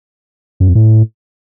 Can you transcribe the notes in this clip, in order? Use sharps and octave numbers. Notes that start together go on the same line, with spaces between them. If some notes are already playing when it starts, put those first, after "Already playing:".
F#2
F2
A2